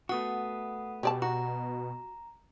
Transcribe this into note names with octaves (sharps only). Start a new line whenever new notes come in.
A3 B3 F#4 F#5 D#6
B2 G3 D5 A5
F#4 A#5